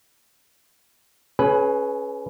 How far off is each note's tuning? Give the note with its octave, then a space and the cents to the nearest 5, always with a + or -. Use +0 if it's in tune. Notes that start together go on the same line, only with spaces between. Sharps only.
C#4 +0 G#4 +30 B4 +0